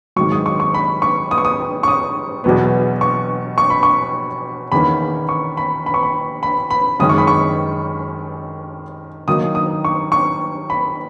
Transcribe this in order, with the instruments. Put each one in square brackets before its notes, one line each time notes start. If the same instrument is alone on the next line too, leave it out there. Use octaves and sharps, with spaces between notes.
[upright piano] G#2 D#3 F#3 C#6
D#6
C#6
C#6
B5
C#6
D#6
C#6
D#6
C#6
D#6
E2 B2 F#3 B3
C#6
C#6
B5
C#6
E2 D#3 A#3 C#4 B5
C#6
B5
B5
C#6
B5
B5
B5
F#2 D#3 G#3 C#4 D#6
C#6
B5
C#6
D#3 F#3 A#3 D#4 D#6
D#6
C#6
C#6
B5